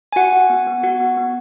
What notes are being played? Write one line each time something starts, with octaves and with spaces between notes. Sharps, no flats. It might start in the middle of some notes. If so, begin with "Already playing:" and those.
G#5
F#4 F#5
F#4
B3
B3
B3 F#4 F#5
B3
B3